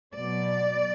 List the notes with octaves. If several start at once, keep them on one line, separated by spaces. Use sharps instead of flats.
B2 F#3 D5